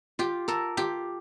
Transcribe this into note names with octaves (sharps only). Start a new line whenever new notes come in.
F4 G4
A4 A#4
F4 G4